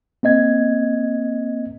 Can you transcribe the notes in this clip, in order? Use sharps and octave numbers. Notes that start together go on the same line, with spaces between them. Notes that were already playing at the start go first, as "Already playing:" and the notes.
A#3 C4 D#5 G#6